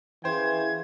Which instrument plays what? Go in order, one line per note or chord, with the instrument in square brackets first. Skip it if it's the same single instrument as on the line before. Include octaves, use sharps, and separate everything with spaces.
[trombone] E3 [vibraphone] C#4 G#4 F5 [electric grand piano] C5 G5 [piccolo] G#6